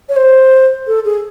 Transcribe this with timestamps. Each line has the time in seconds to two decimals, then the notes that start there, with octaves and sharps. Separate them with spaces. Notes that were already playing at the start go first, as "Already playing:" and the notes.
0.09 C#5
0.16 C5
0.87 A4
1.05 G#4